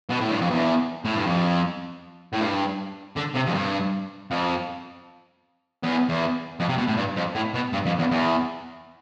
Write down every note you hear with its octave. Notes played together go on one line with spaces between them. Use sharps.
B2
A2
G2
F2
E2
A2
G2
F2
A2
G2
D3
C3
F2
G2
F2
E2
E2
F2
C3
B2
A2
G2
F2
A2
B2
G2
F2
E2
E2